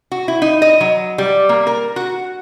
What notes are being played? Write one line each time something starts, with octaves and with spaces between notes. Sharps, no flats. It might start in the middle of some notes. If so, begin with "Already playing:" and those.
F#4
E4
D#4
D#5
F#3
G3
A#3
A#4
F#4